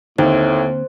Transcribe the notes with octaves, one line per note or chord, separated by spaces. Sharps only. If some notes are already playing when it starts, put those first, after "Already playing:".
D#2 A2 D3 A#3 C4 C5